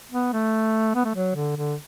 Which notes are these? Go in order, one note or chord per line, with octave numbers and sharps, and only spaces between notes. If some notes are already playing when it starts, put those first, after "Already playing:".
B3
A3
B3
A3
F#3
D3
D3